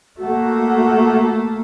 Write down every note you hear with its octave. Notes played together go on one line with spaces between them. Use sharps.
A3 A#3 F#4